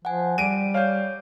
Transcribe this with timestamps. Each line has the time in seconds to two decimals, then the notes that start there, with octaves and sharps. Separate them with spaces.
0.05 F3 F#5 G#5
0.38 G3 D7 D#7
0.74 C#5 D5 F5 G6